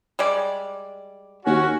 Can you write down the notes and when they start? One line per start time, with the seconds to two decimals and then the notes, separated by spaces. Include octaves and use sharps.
0.19 G3 G#3 D5
1.46 D#2 C#4 F#4